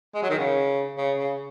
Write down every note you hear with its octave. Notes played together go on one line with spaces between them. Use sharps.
G#3
F#3
D#3
C#3
C#3
C#3